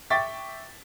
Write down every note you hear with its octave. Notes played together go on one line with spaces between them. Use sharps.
E5 G5 C#6 D6 A6 B6